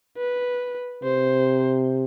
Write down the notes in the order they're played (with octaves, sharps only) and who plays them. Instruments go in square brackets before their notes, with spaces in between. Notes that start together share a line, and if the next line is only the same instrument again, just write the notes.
[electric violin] B4
[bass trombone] C3 [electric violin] C5